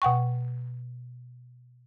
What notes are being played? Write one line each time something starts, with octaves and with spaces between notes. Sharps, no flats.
B2 F#5 G5 C#6